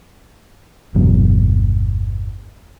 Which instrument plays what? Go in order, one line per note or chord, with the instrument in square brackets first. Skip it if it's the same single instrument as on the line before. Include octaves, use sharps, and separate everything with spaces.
[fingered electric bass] G1 E2 B2 F#3